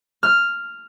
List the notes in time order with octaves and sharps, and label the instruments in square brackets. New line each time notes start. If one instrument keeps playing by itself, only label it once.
[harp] F6